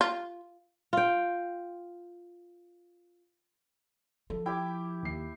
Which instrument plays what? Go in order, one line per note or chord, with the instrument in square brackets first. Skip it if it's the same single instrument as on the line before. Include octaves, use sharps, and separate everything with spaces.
[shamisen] F4
[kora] F4 G5
[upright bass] F3 [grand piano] A4
[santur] E4 G4 D6 [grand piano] G5
[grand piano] D#2 C7